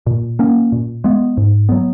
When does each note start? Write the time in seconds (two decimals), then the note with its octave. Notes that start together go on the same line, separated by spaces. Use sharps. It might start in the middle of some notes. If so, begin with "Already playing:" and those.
0.06 A#2
0.39 A#3 C#4
0.72 A#2
1.04 G#3 B3
1.37 G#2
1.69 F#3 B3